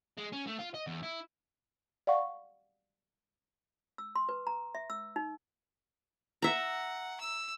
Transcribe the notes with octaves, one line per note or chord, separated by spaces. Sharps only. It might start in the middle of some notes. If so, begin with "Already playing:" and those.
G#3
C#4
A3
F4
D#5
E2
E4
D5 F5 F#5 C#6
E6
C6
B4
A#5
E5
E6
D#4
E5 F#5 A#5
E6